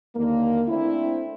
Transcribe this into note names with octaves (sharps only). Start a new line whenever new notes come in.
D#2 D3 D#3 A#3
A3 C4 D4 E4